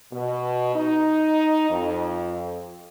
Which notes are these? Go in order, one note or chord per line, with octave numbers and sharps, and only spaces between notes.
B2
D#4
F2